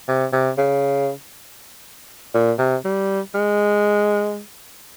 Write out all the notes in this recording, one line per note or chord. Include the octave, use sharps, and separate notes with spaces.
C3
C3
C#3
A#2
C3
G3
G#3